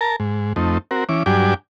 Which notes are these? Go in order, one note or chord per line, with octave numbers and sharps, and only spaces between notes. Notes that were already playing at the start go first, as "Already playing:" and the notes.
A#4 A5 A#5
G#2
F2 A3 C4 D#4
C4 F#4 A#4
E3 C#4 D6
G2 F#3 D4 G4 G#5 D6